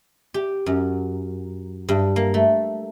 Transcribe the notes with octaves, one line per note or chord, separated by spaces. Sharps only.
G4
F#2
G2
A#3
A3